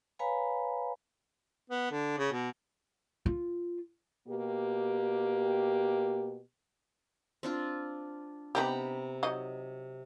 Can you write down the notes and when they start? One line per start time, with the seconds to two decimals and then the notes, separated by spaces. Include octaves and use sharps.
0.19 B4 C#5 F5 G#5 A#5 B5
1.70 B3
1.91 D3
2.18 C#3
2.32 B2
3.26 F4
4.28 B2 A#3 G4
7.43 C4 D4 F4
8.55 C3 B3 D#4 G4 A#5 B5
9.23 F#3 D#4 D#5